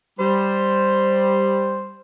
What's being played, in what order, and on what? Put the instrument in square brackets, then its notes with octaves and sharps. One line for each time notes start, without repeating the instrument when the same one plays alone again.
[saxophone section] G3 C5